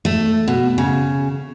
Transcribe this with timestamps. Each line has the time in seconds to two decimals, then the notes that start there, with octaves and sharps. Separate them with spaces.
0.05 A3
0.48 B2
0.78 C#3